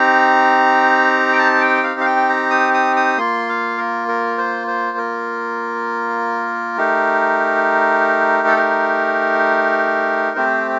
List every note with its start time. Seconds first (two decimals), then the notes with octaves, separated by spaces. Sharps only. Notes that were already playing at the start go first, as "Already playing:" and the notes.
Already playing: C4 D#4 G4 A#5
1.33 G5
1.39 A5
1.61 G5
1.84 F5
2.01 F5
2.06 G5
2.29 A#5
2.51 D#6
2.74 D#6
2.96 D#6
3.18 A#3 F4 C6
3.49 F5
3.78 A#4
4.08 A#4
4.38 C5
4.67 C5
4.98 A#4
6.78 A3 D#4 G4
8.48 A4
8.57 A#4
10.36 A3 C4 G4 C5